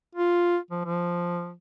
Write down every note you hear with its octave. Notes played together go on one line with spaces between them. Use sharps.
F4
F3
F3